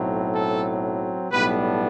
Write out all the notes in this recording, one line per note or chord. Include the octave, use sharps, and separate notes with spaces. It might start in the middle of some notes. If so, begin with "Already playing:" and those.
Already playing: B1 A2 F#3 C4
A4
B1 A2 G3 B3 D4 B4